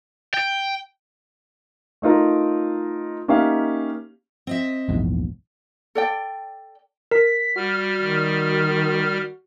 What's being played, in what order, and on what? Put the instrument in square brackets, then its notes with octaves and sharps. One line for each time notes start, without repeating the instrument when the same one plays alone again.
[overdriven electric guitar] G5
[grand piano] A3 D#4 F4 A#4
A#3 C#4 D#4 G4 E5 F5
[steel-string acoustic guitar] C4 D#5 E5
[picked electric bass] A#1 E2 G#2
[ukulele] A4 D5 G5
[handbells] A#4 [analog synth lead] B6
[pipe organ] G3 F6 [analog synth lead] F#4
[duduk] D#3